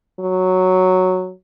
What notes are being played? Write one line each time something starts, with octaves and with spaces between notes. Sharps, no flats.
F#3